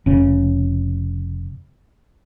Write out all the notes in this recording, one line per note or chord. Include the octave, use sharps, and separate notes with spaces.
F1 C#3 C#4